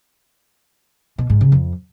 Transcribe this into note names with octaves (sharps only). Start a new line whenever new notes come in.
B2
G#2
C#3
F2